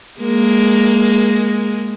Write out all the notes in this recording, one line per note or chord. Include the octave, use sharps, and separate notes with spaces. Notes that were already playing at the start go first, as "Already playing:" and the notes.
G#3 A#3